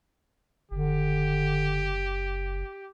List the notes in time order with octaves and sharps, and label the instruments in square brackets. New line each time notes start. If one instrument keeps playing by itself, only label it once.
[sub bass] F#1 [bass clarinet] D3 [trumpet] G4